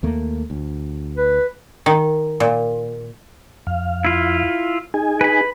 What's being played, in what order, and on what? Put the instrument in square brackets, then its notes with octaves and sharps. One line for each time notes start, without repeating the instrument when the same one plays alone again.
[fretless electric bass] D#2 A3 A#3
D2
[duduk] B4
[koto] D#3
A#2
[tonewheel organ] F2 F5
[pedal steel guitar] E4 F4
[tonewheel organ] D#4 G#4 G#5
[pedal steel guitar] B4 B5